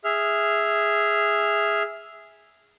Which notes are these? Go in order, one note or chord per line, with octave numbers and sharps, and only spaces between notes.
G#4 E5 F6